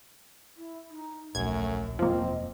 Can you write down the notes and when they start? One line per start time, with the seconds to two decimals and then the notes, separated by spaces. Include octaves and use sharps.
0.57 E4
0.91 D#4
1.35 D1 A#1 F#2 A3 G#6
1.99 E1 F#2 F3 A#3 C4 D#5